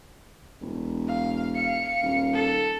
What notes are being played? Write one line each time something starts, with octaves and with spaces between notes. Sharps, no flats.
E1
F5
F5 C#7
D#1
A4